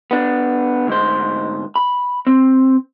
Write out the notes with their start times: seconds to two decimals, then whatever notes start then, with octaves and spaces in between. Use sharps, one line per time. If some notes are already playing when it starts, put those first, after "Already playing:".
0.11 B3 D4
0.87 D2 G#2 C5
1.76 B5
2.27 C4